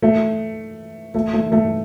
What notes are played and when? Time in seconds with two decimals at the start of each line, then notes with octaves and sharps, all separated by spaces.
0.02 A3
1.14 A3
1.33 A3
1.52 A3